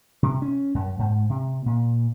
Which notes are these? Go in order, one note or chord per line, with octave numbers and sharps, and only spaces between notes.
C3
C#4
F#2
G#2
C3
A#2